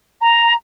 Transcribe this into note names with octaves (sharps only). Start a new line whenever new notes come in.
A#5